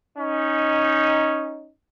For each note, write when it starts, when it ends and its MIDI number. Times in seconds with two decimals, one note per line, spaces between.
0.17 1.70 61
0.17 1.70 63